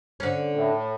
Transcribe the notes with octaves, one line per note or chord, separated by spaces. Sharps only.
D3 C#4
A2